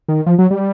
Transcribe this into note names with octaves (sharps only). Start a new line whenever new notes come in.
D#3
F3
F#3
G3